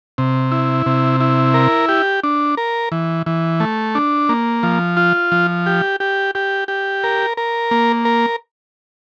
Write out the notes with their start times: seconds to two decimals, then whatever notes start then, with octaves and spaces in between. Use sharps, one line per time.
0.18 C3
0.51 E4
0.86 C3
1.20 E4
1.54 A#4
1.89 G4
2.23 D4
2.57 A#4
2.92 E3
3.26 E3
3.60 A3
3.95 D4
4.29 A#3
4.63 F3
4.97 F4
5.32 F3
5.66 G4
6.00 G4
6.35 G4
6.68 G4
7.04 A#4
7.37 A#4
7.71 A#3
8.05 A#4